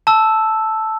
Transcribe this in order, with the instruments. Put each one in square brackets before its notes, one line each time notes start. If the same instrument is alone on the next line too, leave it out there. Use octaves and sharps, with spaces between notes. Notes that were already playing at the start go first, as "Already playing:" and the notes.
[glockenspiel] A5 E6